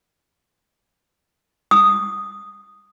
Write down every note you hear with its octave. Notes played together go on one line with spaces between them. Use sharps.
D#6